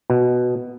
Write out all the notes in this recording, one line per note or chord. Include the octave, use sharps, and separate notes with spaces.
B2